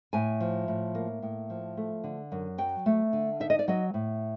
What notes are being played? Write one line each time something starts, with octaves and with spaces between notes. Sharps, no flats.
A2 G#5
F3
A2
A#3
A2
F3
A3
D3
F#2
F#3 G5
A3
D3
D#4 E5
D#5
D5
F#3 D#5
A2